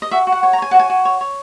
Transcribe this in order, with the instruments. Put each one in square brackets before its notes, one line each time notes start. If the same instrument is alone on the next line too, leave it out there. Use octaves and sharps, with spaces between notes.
[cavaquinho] D#5
F#4 E5
F#4
F#5
C#5
A#5
C#5 G#5
F#4 F#5
G#5
F#4
C#5
C#5